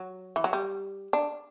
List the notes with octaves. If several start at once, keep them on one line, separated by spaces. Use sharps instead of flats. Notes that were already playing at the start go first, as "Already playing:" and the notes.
Already playing: F#3
E3
F#3
G3
D4